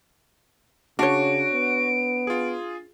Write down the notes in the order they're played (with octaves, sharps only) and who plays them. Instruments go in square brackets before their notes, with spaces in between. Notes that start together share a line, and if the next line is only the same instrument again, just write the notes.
[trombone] C#3 [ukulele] D4 C#5 [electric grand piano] F#4 [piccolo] D7
[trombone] B3
[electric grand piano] F4 G#4